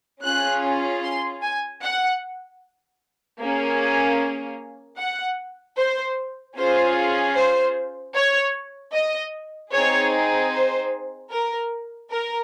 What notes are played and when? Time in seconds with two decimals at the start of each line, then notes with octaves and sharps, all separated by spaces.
0.23 C#4 F4 G#4 F#6
1.03 C6
1.42 G#5
1.82 F#5
3.40 A#3 C#4 G#4
4.98 F#5
5.78 C5
6.56 C#4 F4 G#4 C5
7.36 C5
8.15 C#5
8.94 D#5
9.73 C4 D#4 G#4 C#5
10.53 C5
11.32 A#4
12.11 A#4